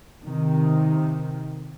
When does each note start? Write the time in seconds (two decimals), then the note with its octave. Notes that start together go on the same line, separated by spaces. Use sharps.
0.23 C3 D#3